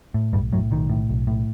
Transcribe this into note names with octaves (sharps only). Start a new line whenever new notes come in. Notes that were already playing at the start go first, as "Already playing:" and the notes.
A2
B1 G2 G3
F#2 A2 F#3
B1 D#3
A2
B1
A2